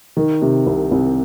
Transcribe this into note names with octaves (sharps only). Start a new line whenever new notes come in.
D#3
C3
C2
C2